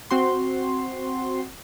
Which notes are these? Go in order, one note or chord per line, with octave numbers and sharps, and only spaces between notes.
C4 F#4 C6